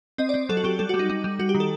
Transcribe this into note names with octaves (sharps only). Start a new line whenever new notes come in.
C4 D#5
D5
C4
F#3 A4
F#4
F#3 G4
G3 A4
F#4
G3
D#4
G3 D#4
G3
G3 F#4
G4
D#3
A4